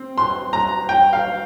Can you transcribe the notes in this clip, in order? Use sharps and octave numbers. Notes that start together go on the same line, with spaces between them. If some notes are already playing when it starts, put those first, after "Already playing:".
Already playing: C4
C6
A#5
G5
F5